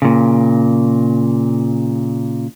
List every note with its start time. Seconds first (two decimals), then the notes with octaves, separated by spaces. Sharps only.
0.02 A#2 C#3